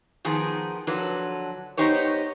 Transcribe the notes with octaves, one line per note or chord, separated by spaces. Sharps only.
D#3 F3 B3 G#4
D3 F3 F#3 B4
B3 D#4 G4 C5 C#5